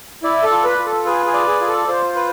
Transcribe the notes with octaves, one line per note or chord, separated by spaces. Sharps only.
E4 D5
A4
F4
B4
F4
A4
G#4 B4
G#4
D5
G#4
F4
A4
F4 C5
B4